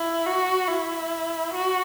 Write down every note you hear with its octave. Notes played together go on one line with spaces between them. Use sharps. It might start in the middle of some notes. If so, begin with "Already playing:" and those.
Already playing: E4
F#4
E4
F#4